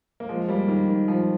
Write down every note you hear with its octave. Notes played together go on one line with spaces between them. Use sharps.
A#3
F3 G#3
G3 A#3
D#3 G3
D#3
F3